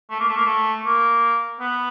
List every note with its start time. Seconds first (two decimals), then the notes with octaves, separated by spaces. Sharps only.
0.10 A3
0.20 A#3
0.29 A3
0.37 A#3
0.46 A3
0.85 A#3
1.60 B3